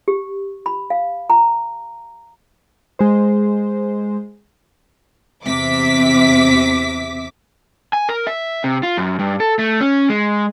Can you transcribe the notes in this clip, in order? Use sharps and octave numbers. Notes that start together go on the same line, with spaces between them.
G4
B5
F5
A#5
G#3 C5
E2 C3 E5 D6 B6
G#5
A#4
E5
C3
F4
F#2
G2
A4
A3
C#4
G#3